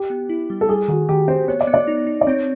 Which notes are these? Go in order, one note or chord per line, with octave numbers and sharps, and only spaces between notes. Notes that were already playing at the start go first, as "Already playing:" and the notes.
Already playing: G4
B3
E4
G3
A4
G3 G#4
D#3 F#4
D#3 G4
C4 C5
B3 C#5
D5
B3
D5
D#4
D#4
D5
C4 C#5